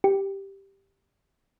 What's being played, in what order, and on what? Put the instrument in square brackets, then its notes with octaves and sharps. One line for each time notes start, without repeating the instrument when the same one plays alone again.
[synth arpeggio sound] G4